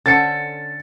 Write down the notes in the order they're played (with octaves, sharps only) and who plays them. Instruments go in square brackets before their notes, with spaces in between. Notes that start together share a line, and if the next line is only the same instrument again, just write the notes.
[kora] D3 C5 [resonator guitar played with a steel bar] C#4 A4 [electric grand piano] A6 C#7